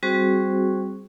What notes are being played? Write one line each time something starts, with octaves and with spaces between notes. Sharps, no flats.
G3 C4 F#4 G#4 C5 C#6